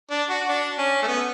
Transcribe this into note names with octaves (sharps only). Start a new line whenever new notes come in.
D4
F#4
D4
C#4
A3
B3